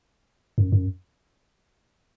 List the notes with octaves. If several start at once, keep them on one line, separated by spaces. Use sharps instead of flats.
F#2
F#2